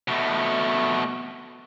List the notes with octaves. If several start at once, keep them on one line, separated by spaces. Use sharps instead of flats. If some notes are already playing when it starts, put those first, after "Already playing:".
B2 A3